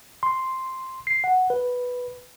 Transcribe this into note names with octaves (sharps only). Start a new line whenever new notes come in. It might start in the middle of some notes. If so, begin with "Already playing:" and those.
C6
C7
F#5
B4